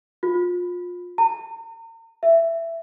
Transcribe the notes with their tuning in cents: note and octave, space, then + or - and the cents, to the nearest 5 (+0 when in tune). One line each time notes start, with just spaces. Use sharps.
F4 +30
A#5 -45
E5 +10